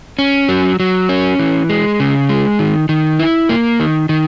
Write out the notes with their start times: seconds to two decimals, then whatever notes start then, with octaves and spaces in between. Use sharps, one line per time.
0.19 C#4
0.48 F#3
0.80 F#3
1.09 C#4
1.39 E3
1.69 G#3
2.00 C#3
2.29 G#3
2.59 D#3
2.89 D#3
3.19 E4
3.49 A#3
3.80 D#3
4.09 D#3